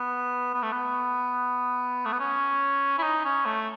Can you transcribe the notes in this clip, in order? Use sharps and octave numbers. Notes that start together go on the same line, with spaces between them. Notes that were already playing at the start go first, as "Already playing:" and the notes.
Already playing: B3
B3
A3
B3
A3
B3
C#4
E4
D#4
C#4
A3